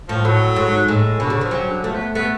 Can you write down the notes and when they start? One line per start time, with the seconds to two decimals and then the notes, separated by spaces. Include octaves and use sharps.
0.08 A2 F3
0.25 A2 F#3
0.56 G#2
0.88 A2 G#3
1.20 B2 D3
1.30 C#3
1.41 F3
1.51 C#3 F#3
1.68 D3
1.84 F3 A3
1.94 B3
2.15 A3 B3